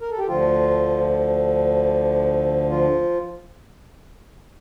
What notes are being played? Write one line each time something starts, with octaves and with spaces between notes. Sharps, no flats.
A#4
A4
G4
D2 D3 F3 F4
F3 F4